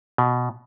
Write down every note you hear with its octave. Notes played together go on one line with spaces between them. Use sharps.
B2